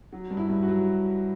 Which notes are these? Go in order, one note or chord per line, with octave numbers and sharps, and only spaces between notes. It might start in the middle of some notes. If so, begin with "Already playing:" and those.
F#3
G2
E4
G2
F#4
F#3